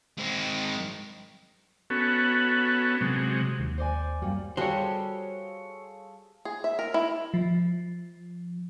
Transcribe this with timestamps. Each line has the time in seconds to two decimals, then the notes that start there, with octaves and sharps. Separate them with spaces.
0.18 G#3 C4
1.90 B3 C#4 F#4 A4
3.01 C3 F#3 G#3
3.60 D#2
3.78 C5 D5 G#5
4.22 F#2 A#2 G3
4.57 G3 F#4 G#4 A4 C5 C#5 F5
6.45 G#4
6.64 E5
6.79 A#4
6.94 E4
7.34 F3